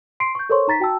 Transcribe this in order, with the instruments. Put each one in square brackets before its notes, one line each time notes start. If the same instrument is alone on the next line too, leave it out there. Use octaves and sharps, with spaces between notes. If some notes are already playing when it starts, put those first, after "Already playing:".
[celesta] C6 C7 D7
C#6 G6
A4 A#4 C5 C#5 C6 C#6
D#4 A#5 A6 B6
F#4 G5 A5 E6